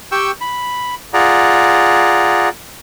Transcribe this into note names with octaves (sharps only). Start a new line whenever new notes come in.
G4 G5 C#6 E6
B5
F4 G#4 D5 F#5 A#5